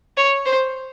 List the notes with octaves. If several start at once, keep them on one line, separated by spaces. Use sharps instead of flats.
C#5
C5